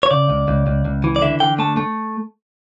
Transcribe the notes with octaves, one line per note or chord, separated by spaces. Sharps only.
C#5
C#3 D5
C#2
C#2
C#2
C#2
E3
D5
D3 E5
D3 G5
A3 A5
A3